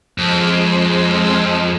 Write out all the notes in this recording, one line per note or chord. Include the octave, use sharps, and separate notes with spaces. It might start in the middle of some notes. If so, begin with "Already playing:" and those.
F2 G#3 C6